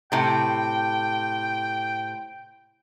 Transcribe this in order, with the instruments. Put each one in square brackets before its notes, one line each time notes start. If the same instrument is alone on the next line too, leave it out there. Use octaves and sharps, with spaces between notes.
[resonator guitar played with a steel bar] A2 C3 [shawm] G5